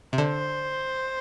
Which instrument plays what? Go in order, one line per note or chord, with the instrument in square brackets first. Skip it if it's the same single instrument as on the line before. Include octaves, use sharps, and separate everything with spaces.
[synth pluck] C3
[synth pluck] D3 [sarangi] C5